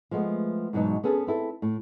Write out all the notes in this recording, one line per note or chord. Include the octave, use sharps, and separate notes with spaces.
F3 G#3 A3 B3
E2 G#2 B2 F#3 D#4
B3 C#4 G#4 A4
C4 E4 A4
A2